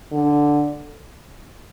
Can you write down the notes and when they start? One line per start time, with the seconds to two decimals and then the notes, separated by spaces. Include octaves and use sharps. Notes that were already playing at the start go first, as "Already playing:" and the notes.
0.12 D3